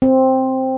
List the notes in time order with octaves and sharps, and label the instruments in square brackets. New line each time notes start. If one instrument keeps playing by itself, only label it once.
[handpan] C4